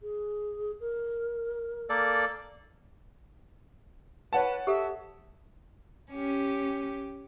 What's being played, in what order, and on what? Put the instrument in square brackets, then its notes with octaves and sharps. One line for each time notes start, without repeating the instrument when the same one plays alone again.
[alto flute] G#4
A#4
[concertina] A#3 A4 D5
[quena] B4 [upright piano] C#5 F#5 A5
[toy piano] G4 A4 [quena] E5
[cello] C#4 G4